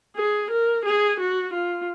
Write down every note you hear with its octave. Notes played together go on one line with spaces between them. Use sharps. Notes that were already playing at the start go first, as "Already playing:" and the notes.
G#4
A#4
G#4
F#4
F4